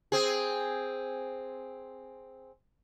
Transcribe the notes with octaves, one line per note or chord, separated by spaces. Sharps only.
C4 G#4